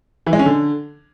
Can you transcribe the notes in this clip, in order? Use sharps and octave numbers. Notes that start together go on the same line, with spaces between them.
E3
G#3
C#4
D3